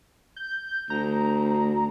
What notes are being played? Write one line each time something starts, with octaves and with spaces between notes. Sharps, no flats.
G6
D2 A#5